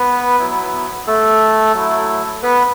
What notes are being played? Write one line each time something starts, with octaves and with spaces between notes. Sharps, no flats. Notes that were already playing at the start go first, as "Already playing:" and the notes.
Already playing: B3 B4
F#3 B3 E4
A3 A4
F#3 A3 E4
B3 B4